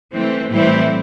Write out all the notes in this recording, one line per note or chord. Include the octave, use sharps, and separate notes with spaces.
E3 A3 C4
A2 E3 G3 C4 E4